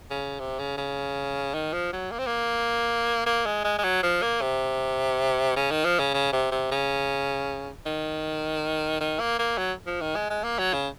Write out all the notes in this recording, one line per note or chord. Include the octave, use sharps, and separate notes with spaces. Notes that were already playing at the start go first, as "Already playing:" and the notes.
C#3
C3
C#3
C#3
D#3
F3
F#3
A#3
C4
A#3
A#3
G#3
G#3
G#3
F#3
F3
A#3
C3
C#3
D#3
F3
C#3
C#3
C3
C3
C#3
D#3
D#3
A#3
A#3
F#3
F3
D#3
G#3
G#3
A#3
F#3
C#3